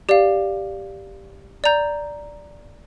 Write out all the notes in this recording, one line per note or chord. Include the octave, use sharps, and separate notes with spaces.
G4 D5 F5
D5 A#5 G6